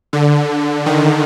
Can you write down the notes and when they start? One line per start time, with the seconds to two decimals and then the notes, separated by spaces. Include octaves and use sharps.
0.13 D3
0.86 D#3